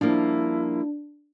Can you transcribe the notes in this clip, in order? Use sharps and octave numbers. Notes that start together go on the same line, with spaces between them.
F3 G3 A#3 D4 E4